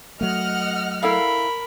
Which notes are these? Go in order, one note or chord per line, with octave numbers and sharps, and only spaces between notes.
F#3 A3 D#5 F#5 F6
E4 A4 A#4 F5 B5